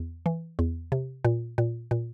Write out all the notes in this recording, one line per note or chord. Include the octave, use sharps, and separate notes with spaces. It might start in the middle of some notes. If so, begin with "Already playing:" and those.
Already playing: E2
E3
E2
C3
A#2
A#2
A#2